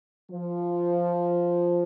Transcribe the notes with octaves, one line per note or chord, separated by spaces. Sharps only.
F3